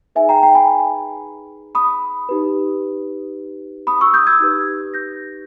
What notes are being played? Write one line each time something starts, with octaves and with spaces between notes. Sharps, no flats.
D#4 G#4 B4 E5 G#5
G5 A#5
G5 A#5
G#5 B5
B5 D#6
D#4 G4 B4
B5 D#6
C#6 E6
D#6 G6
E6 G#6
D#4 G4 B4
G6 A#6